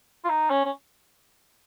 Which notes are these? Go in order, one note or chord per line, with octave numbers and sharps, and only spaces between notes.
F4
D#4
C#4
C#4